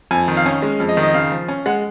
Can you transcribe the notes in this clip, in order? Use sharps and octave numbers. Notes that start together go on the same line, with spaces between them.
F2 G#5
D#3
F5
C#4
G#3
F2
D#5
D#3
D#5
C#3 F5
F3
C#4
G#3 F#5